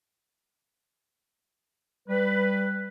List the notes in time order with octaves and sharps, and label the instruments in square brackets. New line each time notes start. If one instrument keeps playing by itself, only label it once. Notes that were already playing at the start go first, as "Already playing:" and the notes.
[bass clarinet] G3 [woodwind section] B4